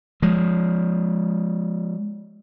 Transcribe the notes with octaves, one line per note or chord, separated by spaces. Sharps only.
F3 G#3